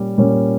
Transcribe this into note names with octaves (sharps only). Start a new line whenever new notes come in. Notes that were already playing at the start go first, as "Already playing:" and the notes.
Already playing: A#2 G3 C#4
A#2 G3 C#4